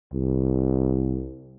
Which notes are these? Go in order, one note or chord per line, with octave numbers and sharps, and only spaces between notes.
C2